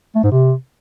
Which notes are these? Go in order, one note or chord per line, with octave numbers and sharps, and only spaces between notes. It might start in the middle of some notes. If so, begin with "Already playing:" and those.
A3
G#2
C3